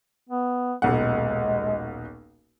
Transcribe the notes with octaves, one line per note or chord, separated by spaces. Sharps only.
B3
D#1 B1 G#3 F#5